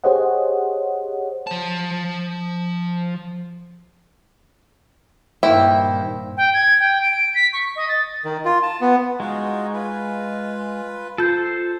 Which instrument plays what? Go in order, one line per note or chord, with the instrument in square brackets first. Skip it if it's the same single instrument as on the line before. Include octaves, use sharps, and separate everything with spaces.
[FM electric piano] G4 G#4 C5 C#5 D#5 F#5
[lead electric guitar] F3 A5
[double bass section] G2 A#2 [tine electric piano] D#3 A#3 C5 [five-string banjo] E4 [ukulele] G5
[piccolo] G5
G#6
G5
D7
B6
C#6
D#5
A6
[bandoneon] D#3
F4
A5
B3
[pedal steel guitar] G#3 [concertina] D#4 F4 F#4
[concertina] F4 B4
[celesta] F4 G6 [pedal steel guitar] A4 C5